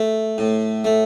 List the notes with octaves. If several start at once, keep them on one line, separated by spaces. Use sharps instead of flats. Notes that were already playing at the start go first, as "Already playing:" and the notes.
Already playing: A3
A2
A3